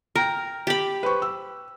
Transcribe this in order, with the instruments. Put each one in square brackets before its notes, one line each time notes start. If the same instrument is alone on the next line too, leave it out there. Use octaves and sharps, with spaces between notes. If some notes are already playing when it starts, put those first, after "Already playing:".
[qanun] A#4 [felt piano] G5 A#5 F6
[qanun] G4 B5
[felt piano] B4 C5 C#6
E6